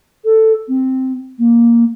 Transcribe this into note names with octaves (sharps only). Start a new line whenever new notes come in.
A4
C4
A#3